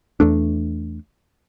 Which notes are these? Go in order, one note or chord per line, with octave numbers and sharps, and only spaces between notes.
E2 A3 D4